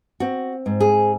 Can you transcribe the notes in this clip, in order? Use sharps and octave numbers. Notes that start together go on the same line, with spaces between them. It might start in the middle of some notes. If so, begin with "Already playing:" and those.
C4 F#4
G#2
G#4